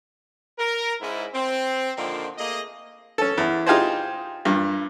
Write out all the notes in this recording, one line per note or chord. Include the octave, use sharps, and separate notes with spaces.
A#4
G#2 C#4 E4
C4
A#2 D3 D#3 F3 C4
A3 A#3 G#4 D#5
C#4 A4
E2
D#4 F4 G4 G#4 C5
G2 A#2